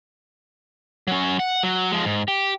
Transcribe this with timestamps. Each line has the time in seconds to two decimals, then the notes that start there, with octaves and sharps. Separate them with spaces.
1.08 F#3 C#4
1.39 F#5
1.63 F#3
1.92 F3 G#3
2.05 G#2
2.28 G4